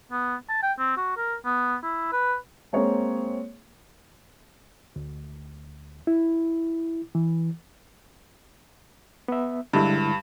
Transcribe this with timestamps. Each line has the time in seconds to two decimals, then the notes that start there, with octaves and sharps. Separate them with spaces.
0.11 B3
0.49 A5
0.63 G5
0.79 C4
0.97 F#4
1.17 A#4
1.45 B3
1.83 E4
2.12 B4
2.73 G#3 A#3 C4 G#4 C#5
4.96 D2
6.07 E4
7.15 E3
9.28 B3 E5
9.73 G2 D3 G#3 E4